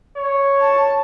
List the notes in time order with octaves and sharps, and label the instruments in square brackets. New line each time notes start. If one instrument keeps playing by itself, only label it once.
[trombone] C#5
[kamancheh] A5